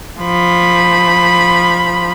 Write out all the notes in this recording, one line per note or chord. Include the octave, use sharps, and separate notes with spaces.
F3 B5